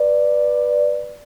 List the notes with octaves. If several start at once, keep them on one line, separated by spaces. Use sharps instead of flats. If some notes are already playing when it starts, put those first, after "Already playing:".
Already playing: B4 D5